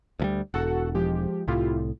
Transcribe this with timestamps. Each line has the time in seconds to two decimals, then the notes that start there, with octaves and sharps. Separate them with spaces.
0.20 D2 F3 G3
0.54 E1 F#4 A4 F#5
0.95 F3 G#3 G4
1.48 C2 A2 E4 F4 G4